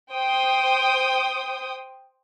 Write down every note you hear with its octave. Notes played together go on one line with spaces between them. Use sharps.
C5 G5 D#6